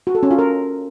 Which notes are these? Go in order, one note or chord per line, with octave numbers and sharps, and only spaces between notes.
F#4
A4
C#4
F4
A#4